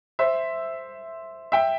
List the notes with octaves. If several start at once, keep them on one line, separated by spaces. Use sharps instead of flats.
C5 E5
E5 G5